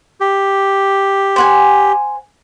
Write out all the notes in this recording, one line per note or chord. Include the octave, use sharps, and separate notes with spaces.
G4
C5 F#5 G#5